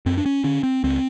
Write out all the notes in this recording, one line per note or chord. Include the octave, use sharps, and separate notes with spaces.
F#2 C4
D4
C#4
D3 C#4
C4
C#2 C4